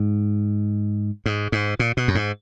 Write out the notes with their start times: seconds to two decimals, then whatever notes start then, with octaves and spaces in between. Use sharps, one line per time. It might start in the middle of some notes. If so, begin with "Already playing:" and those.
Already playing: G#2
1.26 G#2
1.52 G#2
1.79 A#2
1.97 B2
2.08 F#2
2.15 G#2